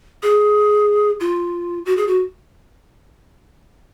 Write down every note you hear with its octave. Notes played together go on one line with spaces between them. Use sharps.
G#4
F4
F#4
G#4
F#4